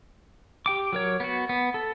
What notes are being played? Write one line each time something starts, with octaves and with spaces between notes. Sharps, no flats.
G4 G5 D6
F#3 A#4 C#5
B3 F#4
B3
A4